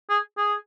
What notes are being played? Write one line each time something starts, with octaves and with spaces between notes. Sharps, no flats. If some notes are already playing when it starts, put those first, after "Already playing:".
G#4
G#4